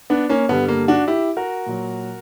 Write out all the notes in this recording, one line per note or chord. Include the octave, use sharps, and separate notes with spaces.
B3 D4
A#3 C#4
G2 D3 G3 B3
A#3
D4 F#4
E4 G4
F#4 A#4
A#2 F#3